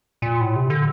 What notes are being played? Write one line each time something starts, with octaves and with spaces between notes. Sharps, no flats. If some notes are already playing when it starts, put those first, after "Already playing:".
A#2
A2
C3
D3